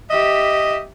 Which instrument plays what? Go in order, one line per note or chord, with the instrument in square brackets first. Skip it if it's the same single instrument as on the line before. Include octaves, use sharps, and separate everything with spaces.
[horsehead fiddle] G4 E5 [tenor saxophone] D#5